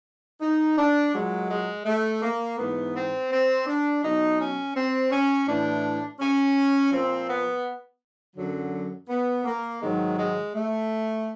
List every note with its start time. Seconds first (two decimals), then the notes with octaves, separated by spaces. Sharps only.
0.41 D#4
0.77 D4
1.12 A#2 F#3 G#3
1.49 G#3
1.85 A3
2.22 A#3
2.57 G#2 E3 B3
2.94 C4
3.30 C4
3.66 D4
4.03 B2 F#3 D#4
4.39 C#4
4.74 C4
5.11 C#4
5.47 A2 E3 D4
6.20 C#4
6.91 A#2 F3 C4
7.28 B3
8.36 F#2 D3 F#3
9.09 B3
9.45 A#3
9.81 G#2 D#3 F#3 G#3
10.17 G#3
10.54 A3